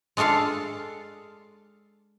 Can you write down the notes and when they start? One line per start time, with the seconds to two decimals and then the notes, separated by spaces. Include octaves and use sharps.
0.17 G#3 D4 F4 A4 F5